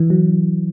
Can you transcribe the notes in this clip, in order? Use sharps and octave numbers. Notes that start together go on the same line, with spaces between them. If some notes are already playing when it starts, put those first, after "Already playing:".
Already playing: E3
F#3